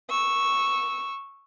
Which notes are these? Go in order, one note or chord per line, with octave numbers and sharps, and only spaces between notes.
C#6 E6